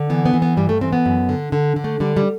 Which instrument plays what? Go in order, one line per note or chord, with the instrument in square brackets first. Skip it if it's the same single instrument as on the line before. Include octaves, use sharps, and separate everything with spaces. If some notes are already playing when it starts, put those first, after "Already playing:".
Already playing: [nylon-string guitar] D3
E3 B3
B3
E3
B3
G2 G3
A3
E3 C4
B3
F#2
D3
D3
D3
A3
D3 G3
G3